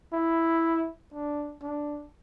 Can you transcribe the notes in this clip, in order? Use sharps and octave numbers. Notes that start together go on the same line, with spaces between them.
E4
D4
D4